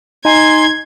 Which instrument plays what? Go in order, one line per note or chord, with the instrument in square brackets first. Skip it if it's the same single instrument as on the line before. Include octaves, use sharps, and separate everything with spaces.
[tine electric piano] D#4 G#5 [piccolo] C6 [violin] G#6